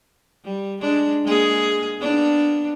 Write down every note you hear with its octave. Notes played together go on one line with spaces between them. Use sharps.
G3
G#3 D4
G#3 A#3 G#4
A#3 B3 D4